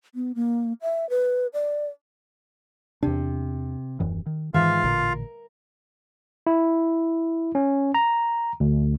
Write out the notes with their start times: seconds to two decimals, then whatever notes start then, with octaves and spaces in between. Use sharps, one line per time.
0.15 B3
0.35 A#3
0.82 E5
1.10 B4
1.54 D5
3.03 E2 C3 D4
4.00 D#1 F#2 E3
4.26 D#3
4.54 G#2 D#3 E3 F4 E5 F5
4.84 A1 A#2 D3 A#4
6.47 E4
7.55 C#4
7.94 A#5
8.60 D2